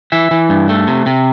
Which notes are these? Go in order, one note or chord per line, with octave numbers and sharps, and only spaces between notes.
E3 E5
E3
G2
A3
C3
C3